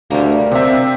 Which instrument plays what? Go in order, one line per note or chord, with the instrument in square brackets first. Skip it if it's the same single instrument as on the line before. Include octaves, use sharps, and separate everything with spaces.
[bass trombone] D2 [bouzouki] G3 A#3
[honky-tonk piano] C3 E5 [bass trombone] C4